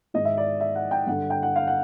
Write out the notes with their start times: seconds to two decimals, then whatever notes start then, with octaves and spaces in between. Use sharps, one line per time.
0.14 G#2 D#3 D#5
0.25 E5
0.37 D5
0.60 E5
0.75 F#5
0.91 G5
1.06 G2 D3 F#5
1.30 G5
1.43 F#5
1.56 F5
1.67 F#5